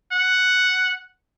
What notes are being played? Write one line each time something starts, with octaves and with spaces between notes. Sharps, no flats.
F#5